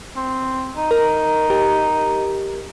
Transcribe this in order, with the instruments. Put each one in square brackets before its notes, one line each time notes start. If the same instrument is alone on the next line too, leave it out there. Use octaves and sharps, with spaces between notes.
[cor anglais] C4
D#4
[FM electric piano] A#4
G4 A#4